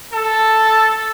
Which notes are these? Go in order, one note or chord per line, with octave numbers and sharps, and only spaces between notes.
A4